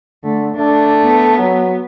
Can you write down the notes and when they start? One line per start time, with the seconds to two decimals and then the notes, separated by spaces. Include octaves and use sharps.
0.24 D3 A3
0.56 A3 D4
1.04 B3
1.38 F#3